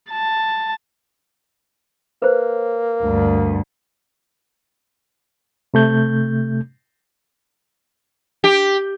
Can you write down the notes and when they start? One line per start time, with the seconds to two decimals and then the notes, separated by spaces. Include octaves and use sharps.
0.10 A5
2.22 A#3 B4 C5
3.03 D2 G2
5.74 C3 A3 G6
8.44 G4